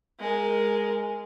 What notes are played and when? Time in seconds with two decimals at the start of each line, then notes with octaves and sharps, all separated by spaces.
0.20 G#3 A#4